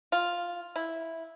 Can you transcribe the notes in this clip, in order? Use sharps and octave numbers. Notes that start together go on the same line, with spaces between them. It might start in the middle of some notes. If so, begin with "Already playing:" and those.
F4
E4